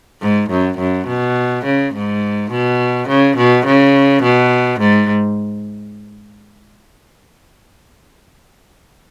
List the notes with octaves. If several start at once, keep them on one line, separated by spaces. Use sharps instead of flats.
G#2
F#2
F#2
B2
C#3
G#2
B2
C#3
B2
C#3
B2
G#2